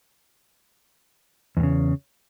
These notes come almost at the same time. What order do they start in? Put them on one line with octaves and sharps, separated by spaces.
E2 A2 C#3